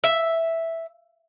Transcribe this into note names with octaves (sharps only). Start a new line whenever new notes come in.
E5